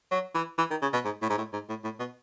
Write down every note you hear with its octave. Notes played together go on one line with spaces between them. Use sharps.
F#3
E3
E3
D#3
C#3
B2
G#2
A2
G#2
A2
G#2
A2
A2
B2